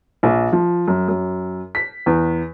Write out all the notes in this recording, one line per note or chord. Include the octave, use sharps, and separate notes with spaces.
A#1
F3
F#2
F#2
B6
E2